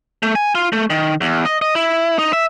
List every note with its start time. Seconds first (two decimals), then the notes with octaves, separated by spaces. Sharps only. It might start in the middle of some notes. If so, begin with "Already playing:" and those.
0.23 A3
0.35 G#5
0.55 F4
0.73 A3
0.90 D#3
1.21 E2
1.46 D#5
1.62 D#5
1.75 E4
2.19 D#4
2.33 E5